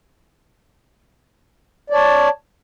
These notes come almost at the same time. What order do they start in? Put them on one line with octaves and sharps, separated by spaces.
D5 C#5 A5